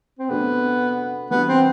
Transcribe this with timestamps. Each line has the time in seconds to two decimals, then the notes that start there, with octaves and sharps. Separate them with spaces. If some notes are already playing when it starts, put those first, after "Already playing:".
0.19 C4
0.29 C3 F#3 A3 B3 D4
1.31 E3 G3 B3 D4 F#4
1.48 C4